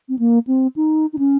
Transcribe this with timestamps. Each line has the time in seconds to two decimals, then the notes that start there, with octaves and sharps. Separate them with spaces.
0.09 C4
0.19 A#3
0.47 C4
0.76 D#4
1.13 D#4
1.19 C#4